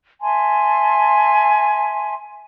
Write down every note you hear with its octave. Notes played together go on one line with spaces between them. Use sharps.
E5 G#5 A5 C6